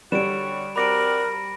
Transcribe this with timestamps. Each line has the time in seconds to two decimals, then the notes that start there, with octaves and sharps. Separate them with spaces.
0.12 D3 G3 F#4 C#5 D7 E7
0.76 C4 F#4 A#4 D5 B5 A#6 D7